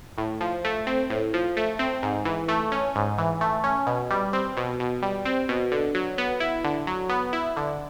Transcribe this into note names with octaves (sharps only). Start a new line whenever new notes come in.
A2
F3
A3
C4
A2
F3
A3
C4
G#2
E3
A3
C#4
G#2
E3
A3
C#4
B2
G3
C4
B2
B2
G3
C4
B2
D3
F#3
B3
E4
D3
F#3
B3
E4
D3